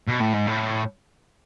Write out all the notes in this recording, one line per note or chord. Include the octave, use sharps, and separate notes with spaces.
B2
A2
G#2
A2